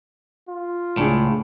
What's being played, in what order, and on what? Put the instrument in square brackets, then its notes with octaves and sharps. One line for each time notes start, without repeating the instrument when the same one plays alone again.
[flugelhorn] F4
[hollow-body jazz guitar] C#2 D4 G#4 [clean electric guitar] A2